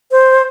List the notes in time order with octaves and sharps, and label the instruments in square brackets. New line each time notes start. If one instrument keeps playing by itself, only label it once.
[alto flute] C5